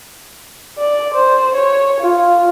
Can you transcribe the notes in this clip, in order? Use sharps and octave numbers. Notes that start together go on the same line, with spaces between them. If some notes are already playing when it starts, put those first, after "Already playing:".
D5
C5
C#5
F4